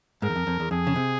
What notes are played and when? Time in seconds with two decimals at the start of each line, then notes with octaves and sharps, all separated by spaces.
0.22 G#2 A#4
0.30 E2
0.36 F2
0.47 F2
0.60 E2
0.71 F2 G#4
0.87 C#3
0.96 C3